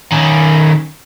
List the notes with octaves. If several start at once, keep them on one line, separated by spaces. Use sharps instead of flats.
D#3 C#4